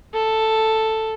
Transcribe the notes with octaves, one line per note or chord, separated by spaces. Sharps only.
A4